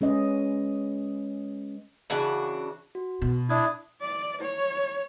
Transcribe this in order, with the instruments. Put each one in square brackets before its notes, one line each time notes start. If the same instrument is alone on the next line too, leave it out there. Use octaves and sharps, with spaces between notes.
[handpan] G#3 C#4 B4 D#5
[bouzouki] C#3 E3 D4 F#4
[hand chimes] F#4
[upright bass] B2
[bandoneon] D4 E4 [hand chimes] D5 D#6 G#6
[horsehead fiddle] D5
C#5